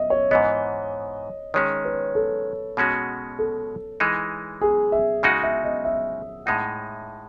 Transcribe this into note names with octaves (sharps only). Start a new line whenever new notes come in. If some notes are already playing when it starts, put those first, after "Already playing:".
Already playing: D#5 E5
C#5
G#2 E3 B3 D#5
D#3 G#3 C#4 C#5
B4
A4
B2 G#3 C#4 F#4
A4
E3 G#3 D#4
G#4
E5
C#3 G#3 D#4 F#4 F#5
E5
D#5
E5
A2 G#3 D#4 F#5